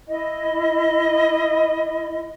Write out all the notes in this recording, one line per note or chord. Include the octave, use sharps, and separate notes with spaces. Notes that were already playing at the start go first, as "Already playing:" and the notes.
E4 D#5